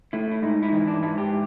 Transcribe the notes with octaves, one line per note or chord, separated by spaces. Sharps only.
A3 E4
E4
G#2 D#4
E4
E3 D#4
D4
G#2 E4
G4